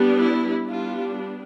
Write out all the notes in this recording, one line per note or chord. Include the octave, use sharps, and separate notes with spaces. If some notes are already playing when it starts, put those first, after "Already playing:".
Already playing: G3 B3 D4
E4
G3 B3 D4 F4